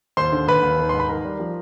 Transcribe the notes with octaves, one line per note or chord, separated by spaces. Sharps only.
D#2 C5 C6
D3
D#2 B4 B5
D#2
D#3
G#2 C6
B5
D#3 A#4 A#5
G3
F3